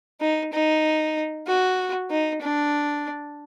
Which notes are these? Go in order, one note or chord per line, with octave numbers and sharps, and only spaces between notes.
D#4
D#4
F#4
D#4
D4